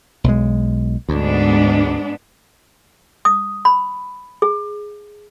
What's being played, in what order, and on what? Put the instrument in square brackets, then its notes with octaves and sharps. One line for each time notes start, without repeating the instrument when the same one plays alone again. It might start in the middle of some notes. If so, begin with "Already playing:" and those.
[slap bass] B1 G#3
[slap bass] D2 [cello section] G#2 B3 D4
[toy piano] D#6
B5
G#4